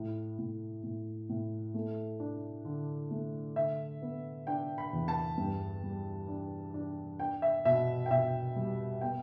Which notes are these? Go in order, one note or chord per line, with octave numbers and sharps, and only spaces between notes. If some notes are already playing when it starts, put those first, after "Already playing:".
Already playing: A2
A2
A2
A2
A3
D4
D3
A3
D3 E5
B3
D4 G5
B5
E2
A5
G2
G3
D4
D4
D4 G5
E5
B2 E5
G5
B2 E5
G3
B3 G5